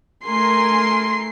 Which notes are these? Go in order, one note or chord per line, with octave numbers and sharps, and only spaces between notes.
A3 A#4 G#5 C6 C7